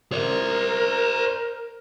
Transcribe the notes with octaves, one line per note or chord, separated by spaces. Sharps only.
A#4 C5 D5